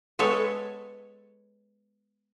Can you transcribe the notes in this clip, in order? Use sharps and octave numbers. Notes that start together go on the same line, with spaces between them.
G#3 B3 A4 C#5